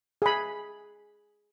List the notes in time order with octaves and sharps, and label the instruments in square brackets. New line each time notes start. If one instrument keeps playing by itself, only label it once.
[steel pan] G#4 B5